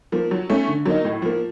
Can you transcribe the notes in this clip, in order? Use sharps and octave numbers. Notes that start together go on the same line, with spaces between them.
F3 A#3
F#3
A3 C#4
D3
F#3 A#3 D#4
A2
F3 A#3